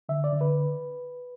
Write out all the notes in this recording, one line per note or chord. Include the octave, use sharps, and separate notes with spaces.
D3 E5
D5
D3
B4